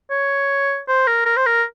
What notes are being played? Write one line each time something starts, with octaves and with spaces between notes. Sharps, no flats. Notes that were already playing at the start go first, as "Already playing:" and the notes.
C#5
C5
A#4
A#4
C5
A#4